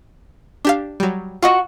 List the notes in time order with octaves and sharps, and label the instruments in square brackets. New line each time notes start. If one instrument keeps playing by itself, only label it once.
[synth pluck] D4 G4 F5
F#3 G3
[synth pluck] F4 D#5 [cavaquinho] F#4 C#6